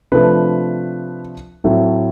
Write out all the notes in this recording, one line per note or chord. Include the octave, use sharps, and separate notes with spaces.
C3 F3 A3 D4 B4
A2 F#3 A3 C4